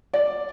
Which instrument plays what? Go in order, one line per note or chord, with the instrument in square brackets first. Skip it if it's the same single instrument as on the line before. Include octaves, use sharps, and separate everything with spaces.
[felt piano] D5